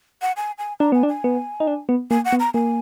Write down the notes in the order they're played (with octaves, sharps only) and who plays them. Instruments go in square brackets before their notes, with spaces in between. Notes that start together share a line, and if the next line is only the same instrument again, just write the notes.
[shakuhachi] F#5
G#5
G#5
[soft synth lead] D4 [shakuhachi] A#5
[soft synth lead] B3 [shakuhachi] G#5
[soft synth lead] D4
[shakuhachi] G#5
[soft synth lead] B3
D#4
D4
B3
[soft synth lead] A#3 [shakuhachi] G#5
[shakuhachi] F#5
[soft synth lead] B3
[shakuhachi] A#5
[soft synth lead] A#3 [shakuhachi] G#5